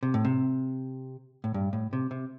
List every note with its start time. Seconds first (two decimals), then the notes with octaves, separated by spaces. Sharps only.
0.03 C3
0.14 A2
0.25 C3
1.44 A2
1.54 G2
1.73 A2
1.93 C3
2.11 C3